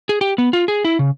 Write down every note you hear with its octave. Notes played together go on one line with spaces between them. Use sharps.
G#4
G4
B3
F4
G#4
E4
C#3